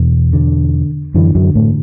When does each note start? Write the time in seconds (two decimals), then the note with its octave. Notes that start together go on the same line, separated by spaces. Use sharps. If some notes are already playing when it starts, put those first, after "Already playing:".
Already playing: E2 B2
0.33 D3
1.14 F#2 D3 E3
1.35 F#2 F#3
1.55 A2 A3